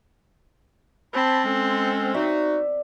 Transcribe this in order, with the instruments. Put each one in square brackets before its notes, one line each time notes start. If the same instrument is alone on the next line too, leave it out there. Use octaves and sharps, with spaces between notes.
[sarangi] C4 [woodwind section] A5 B5
[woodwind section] G#3 C#4 A4
[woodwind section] D#4 F#4 [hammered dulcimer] D5 E5